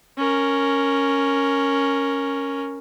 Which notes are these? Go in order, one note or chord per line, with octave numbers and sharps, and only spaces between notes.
C#4 A#4